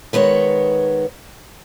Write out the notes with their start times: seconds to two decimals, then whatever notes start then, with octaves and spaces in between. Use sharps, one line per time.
0.13 D#3 G#3 B3 C#5